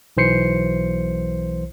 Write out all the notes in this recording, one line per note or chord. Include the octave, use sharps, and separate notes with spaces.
B1 E3 C5 C7 C#7